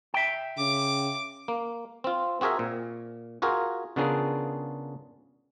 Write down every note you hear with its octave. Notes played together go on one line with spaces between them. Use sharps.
E5 G5
C#3 D6
A#3
C4 F4
C4 F#4 G#4 A#4 E5
A#2
F4 F#4 G#4 A#4
C#3 B3 D4 F4 G#4 A#4